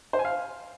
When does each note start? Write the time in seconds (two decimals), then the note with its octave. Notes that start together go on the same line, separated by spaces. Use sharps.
0.13 C5
0.19 G#5
0.25 F5